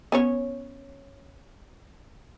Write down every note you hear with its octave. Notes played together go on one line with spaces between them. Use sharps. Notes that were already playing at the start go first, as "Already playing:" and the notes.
B3 C#4 C#5